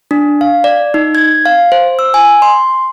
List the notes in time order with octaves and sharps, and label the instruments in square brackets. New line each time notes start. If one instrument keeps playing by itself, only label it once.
[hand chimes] D4
F5
D5
D#4
G#6
F5
C5
E6
G#5
C6